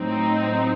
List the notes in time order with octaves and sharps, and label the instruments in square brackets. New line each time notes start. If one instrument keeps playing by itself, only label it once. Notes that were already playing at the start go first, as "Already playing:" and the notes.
Already playing: [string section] A2 F#3 C4 D#4